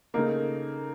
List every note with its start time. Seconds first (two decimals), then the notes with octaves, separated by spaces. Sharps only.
0.14 C#3 A3 A#3 D#4